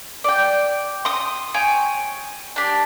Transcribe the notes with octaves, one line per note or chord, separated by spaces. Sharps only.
D5 G5
C6 D#6
C#5 G5 G#5
D4 G4